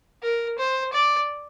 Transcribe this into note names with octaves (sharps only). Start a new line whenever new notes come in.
A#4
C5
D5